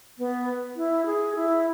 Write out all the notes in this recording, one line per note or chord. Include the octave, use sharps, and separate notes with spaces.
B3
E4
G#4
E4